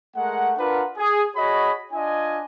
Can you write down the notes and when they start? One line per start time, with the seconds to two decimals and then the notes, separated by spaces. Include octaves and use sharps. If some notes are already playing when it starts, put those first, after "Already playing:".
0.16 G#3 A3 A#4 F#5
0.58 D4 F4 A#4 B4 F#5
0.97 G#4
1.36 F#4 G#4 C#5 D#5 B5
1.92 D4 F4 D#5 G#5